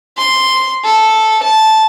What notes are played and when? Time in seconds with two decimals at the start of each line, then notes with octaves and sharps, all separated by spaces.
0.17 C6
0.84 A4
1.43 A5